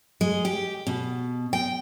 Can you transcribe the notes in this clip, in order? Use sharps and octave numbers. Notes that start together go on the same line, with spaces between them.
G#3
G4
B2
G5